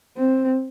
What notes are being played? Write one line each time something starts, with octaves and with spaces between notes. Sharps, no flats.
C4